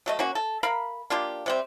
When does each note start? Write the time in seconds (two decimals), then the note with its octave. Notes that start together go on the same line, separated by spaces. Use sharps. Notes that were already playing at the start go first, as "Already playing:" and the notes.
0.06 F#3 A3 D#5
0.19 A#3 C#4 F#4
0.35 A4
0.63 A#4 F5 A#5 B5
1.10 A#3 D4 F4 G4
1.46 C3 G3 C4